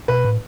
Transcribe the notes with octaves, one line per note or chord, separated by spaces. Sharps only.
B2 B4
A2